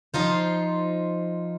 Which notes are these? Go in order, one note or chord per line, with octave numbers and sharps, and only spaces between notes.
F3 D#4 F4 C5